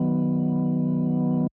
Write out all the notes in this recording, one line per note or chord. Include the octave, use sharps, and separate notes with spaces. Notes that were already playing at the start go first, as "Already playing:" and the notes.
Already playing: D#3 F#3 B3